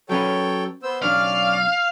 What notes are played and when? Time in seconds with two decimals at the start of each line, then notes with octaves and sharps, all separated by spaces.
0.09 F#3 C#4 A4 B4 C#5 G5
0.83 B3 C5 E6
1.02 B1 C#4 D4 D5 F5